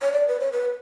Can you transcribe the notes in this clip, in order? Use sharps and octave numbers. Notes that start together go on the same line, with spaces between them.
C#5
D5
B4
C#5
B4